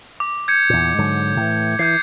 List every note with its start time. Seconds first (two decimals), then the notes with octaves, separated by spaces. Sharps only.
0.20 D6
0.48 G6 G#6 C#7
0.70 E2 A#2
0.99 G#2 D3 F#3
1.37 A2 E3
1.79 E3 G6 G#6 C7